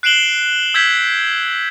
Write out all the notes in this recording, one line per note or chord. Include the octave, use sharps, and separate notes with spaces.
F#6 C7 D7 E7 F#7 G7
E6 G6 G#6 B6